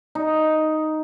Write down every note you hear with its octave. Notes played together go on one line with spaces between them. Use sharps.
D#4